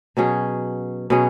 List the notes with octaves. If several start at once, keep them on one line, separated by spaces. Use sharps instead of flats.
B2 F#3 C#4 G#4
B2 F#3 C#4 G#4